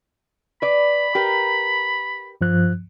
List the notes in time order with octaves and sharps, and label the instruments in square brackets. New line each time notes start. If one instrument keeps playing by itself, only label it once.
[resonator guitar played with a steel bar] B4 D5 [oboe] B5
[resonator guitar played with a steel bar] G4 A#4 B4
[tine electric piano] G2 F3 F#6